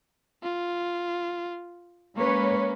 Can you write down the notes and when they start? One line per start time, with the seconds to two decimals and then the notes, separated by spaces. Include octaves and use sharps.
0.43 F4
2.16 G#3 A#3 C#4 B4 C#5